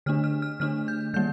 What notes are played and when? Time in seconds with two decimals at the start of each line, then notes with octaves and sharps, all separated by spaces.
0.06 D3 A3 D4 F6
0.24 F6
0.42 F6
0.60 D3 A3 D4 F6
0.88 G6
1.14 D#3 G3 A#3 G6